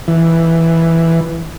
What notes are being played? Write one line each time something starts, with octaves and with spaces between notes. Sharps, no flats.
E3